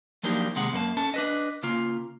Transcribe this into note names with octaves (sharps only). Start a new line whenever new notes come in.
F3 F#3 A#3 D4 D#4 G4
D#2 C3 G#3 F#5
F#2 A#3 B4 A5
C#4 A4 A5
D4 B4 D#5
C#3 A#3 F4